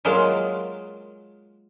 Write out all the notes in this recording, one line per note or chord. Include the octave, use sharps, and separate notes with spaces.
F#3 G#3 A#3 F4